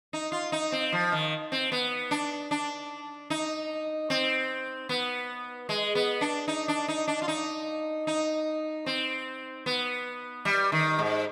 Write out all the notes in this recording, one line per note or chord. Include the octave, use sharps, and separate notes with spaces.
D#4
F4
D#4
C4
F3
D#3
C4
B3
D4
D4
D#4
C4
B3
G#3
B3
D4
D#4
D4
D#4
D4
F4
D#4
D#4
C4
B3
G3
D#3
G#2